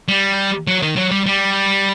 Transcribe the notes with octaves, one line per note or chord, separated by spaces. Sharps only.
G3
F#3
D#3
F#3
G3
G3